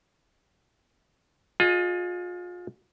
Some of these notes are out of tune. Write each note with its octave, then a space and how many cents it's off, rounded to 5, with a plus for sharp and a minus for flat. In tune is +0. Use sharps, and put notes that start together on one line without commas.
F4 +30 G#4 +5 D#5 +0